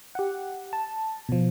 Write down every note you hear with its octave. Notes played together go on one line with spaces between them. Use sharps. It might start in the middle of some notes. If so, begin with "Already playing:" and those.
G4 F#5
A5
B2 F3